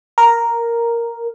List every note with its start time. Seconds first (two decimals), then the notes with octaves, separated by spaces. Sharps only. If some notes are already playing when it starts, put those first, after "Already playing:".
0.18 A#4